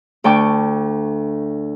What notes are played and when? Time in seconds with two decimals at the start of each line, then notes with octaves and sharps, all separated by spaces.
0.24 D2 G5 A5 C#6 D6